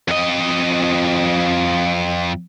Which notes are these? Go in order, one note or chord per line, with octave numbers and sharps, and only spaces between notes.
F2 D#5